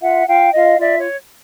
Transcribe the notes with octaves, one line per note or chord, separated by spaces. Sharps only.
F4 E5 F#5
F4 F5 G5
F4 D#5 F5
F4 D5 E5
C#5